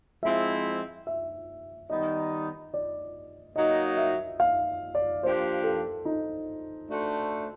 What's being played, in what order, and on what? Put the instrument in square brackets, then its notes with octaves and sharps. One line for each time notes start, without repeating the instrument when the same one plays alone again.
[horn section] F3 G#3 C4 E4 [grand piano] E5
[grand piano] E5
[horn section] D#3 G3 B3 D#4 [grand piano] D#5
[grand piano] D5
[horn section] F#3 A#3 D#4 [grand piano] D#5
[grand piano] E5
F5
D5
[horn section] F3 A#3 D4 G4 [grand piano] C5
[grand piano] A4
D#4
[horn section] A3 D4 F#4 A4 C5